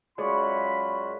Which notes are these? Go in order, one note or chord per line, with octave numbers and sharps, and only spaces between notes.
F#2 G#3 F4 F#4 C#5 D5 B5